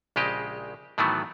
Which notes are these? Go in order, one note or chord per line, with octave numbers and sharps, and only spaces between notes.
A#1 C#3 G#3 G4 D#5
A2 D#3 E3 F#3 A3 B3